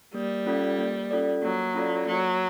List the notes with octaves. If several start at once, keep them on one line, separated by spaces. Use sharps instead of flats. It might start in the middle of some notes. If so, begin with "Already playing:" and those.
G3 A#3
C#4 F4 A4 D5
A#3
C#4 F4 A4 D5
F#3 A#3
C#4 F4 A4 D5
F#3 A#3